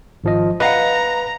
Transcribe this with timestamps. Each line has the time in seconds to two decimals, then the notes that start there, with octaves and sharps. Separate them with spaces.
0.24 G#1 F3 D#5
0.60 B4 D#5 F5 F#5 A#5